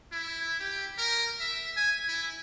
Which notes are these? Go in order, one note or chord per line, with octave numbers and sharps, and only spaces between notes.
E4
G4
A#4
E5
G#5
E4